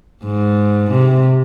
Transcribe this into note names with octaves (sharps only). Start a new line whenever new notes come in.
G#2
C3